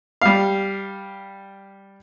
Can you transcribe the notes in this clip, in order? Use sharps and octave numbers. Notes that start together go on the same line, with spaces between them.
G3 F5